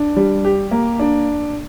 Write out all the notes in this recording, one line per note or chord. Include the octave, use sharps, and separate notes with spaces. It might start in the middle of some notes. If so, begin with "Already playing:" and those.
Already playing: D4
G3
G4
A#3
D4